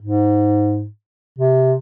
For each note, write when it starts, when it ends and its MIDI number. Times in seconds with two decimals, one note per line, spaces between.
0.02 0.87 44
1.39 1.74 48